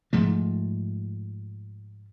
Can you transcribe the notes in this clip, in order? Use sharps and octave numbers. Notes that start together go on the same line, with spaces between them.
G#2 F3 A3